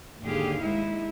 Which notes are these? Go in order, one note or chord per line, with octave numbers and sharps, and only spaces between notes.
D#2 G#2 D3 G4 G#4 F5
G#3 D#4 E4